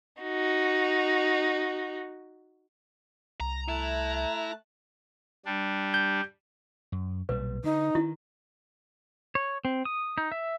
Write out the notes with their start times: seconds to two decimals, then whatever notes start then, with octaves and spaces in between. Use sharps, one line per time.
0.22 D#4 F#4
3.40 C2 A#5
3.68 A3 E4 A5 F#6
5.45 G3 D4
5.94 G6
6.92 F#2
7.29 B1 A#2 G3 B4
7.64 D3 D#4
7.95 D#3 E4
9.35 C#5
9.65 C4
9.85 D#6
10.18 D#4
10.32 E5